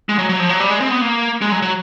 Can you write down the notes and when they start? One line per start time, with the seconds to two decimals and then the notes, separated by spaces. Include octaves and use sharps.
0.09 G#3
0.19 F#3
0.29 F#3
0.40 F3
0.49 F#3
0.60 G3
0.70 G#3
0.81 C4
0.91 B3
1.01 A#3
1.41 G#3
1.52 F#3
1.62 F#3